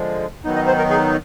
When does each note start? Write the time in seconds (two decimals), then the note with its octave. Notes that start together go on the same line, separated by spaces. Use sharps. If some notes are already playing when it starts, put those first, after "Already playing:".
Already playing: D3 F3 G#3
0.44 D#3 F#3 B3 D#4
0.55 D#5
0.66 C5
0.78 A#4
0.90 G#4